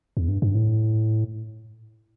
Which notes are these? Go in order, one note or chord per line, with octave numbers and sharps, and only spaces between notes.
E2
G2
G2
A2